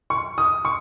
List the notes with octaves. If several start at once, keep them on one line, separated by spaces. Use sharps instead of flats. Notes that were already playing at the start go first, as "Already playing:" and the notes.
C#6
D#6
C#6